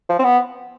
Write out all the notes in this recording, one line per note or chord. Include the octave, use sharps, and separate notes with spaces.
F3
C4
B3